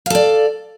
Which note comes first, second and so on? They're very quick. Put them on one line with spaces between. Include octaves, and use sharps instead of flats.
F5 A4 D5